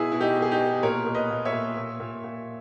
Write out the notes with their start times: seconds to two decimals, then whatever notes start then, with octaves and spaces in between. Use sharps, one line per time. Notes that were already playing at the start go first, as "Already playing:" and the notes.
Already playing: B2 E4 G#4
0.12 B2 E4
0.21 D#4 G4
0.37 B2
0.42 G#4
0.51 D#4 G4
0.60 B2
0.83 A#2 A#4 C#5
1.06 A#2
1.15 B4 D#5
1.31 A#2
1.45 C#5 E5
1.53 A#2
1.77 A#2
2.00 A#2
2.24 A#2